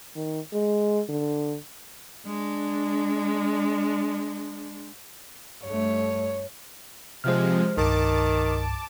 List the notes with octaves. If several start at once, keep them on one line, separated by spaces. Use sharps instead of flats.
D#3
G#3
D3
G#3 D4
G2 A3 C#5
C3 F3 G#3 C5 F6
C2 G2 D#3 A5 D6